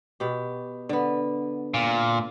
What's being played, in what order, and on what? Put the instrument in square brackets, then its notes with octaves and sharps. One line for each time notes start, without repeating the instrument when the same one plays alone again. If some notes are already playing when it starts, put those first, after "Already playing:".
[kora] B2 G4
D3 B3
[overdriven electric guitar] A#2